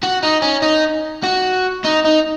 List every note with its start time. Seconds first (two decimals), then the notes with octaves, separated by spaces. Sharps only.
0.03 F#4
0.23 D#4
0.42 C#4
0.62 D#4
1.24 F#4
1.85 D#4
2.05 D#4